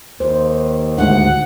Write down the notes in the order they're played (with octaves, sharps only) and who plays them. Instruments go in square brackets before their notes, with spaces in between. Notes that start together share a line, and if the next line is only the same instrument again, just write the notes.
[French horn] D#2 [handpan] C5
[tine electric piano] D2 G#2 [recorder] F#5